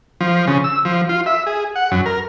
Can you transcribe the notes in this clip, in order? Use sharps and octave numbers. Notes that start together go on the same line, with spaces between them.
F3
C#3
E6
F3
F4
E5
G#4
F#5
F#2
A#4